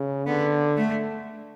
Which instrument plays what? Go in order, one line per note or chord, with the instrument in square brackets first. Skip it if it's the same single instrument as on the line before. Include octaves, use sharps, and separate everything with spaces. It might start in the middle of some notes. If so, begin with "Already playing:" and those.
Already playing: [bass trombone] C#3
[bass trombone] D3 [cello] B3
[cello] A3